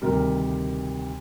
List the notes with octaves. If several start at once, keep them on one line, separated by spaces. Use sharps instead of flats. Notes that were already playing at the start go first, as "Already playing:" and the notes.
D2 C3 D#3 G3 A#4